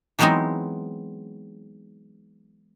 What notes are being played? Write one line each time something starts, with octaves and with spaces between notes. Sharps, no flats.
E3 F#3 G#3 B3 C4 D#4